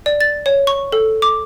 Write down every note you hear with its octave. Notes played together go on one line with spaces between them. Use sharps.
D5
A6
C#5
C#6
A4
D6